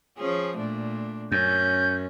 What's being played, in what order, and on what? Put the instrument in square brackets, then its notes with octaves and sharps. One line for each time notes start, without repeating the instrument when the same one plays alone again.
[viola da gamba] F3 C#4 G#4
A#2 A3 D4
[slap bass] F#2 [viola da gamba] C#4 [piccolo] G6